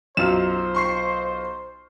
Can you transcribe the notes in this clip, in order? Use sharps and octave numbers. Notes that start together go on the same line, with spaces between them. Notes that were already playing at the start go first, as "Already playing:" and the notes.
B1 F#2 F4 C5 F6 E7
C6 C#6 C7